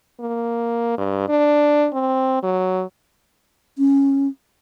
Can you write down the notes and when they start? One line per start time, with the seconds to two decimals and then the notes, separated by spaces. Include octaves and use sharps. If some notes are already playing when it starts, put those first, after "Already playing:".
0.20 A#3
0.98 G2
1.29 D4
1.93 C4
2.43 F#3
3.78 C#4